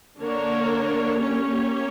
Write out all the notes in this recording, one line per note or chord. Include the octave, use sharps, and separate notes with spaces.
D3 A#3 D4 A#4 C#5
A#3 C#4 G4 C#5